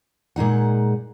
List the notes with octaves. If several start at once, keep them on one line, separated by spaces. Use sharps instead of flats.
A#2 G#3 D#4 F#5